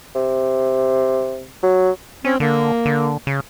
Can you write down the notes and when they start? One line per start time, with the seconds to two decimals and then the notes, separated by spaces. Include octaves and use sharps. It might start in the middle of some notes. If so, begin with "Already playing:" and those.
0.15 C3
1.63 F#3
2.25 C4 C#4
2.40 D3 A#3
2.86 D3
3.27 C#3